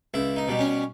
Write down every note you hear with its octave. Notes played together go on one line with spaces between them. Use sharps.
C#2 E4
D#4
B2 G3
C#4